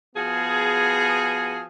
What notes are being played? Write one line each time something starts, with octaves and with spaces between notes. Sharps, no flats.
F3 B3 F#4 G#4